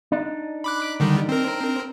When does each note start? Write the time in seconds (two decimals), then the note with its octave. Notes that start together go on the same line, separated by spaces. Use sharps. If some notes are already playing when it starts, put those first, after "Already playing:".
0.12 D4 D#4
0.64 B5 D6 F#6
1.00 D3 D#3 G3
1.29 C4 A#4